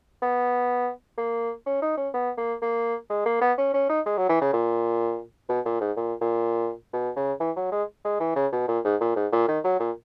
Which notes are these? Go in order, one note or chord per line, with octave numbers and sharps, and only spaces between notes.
B3
A#3
C#4
D#4
C#4
B3
A#3
A#3
G#3
A#3
B3
C#4
C#4
D#4
G#3
F#3
E3
C#3
A#2
B2
A#2
G#2
A#2
A#2
B2
C#3
E3
F#3
G#3
G#3
E3
C#3
B2
A#2
G#2
A#2
G#2
A#2
D#3
F#3
A#2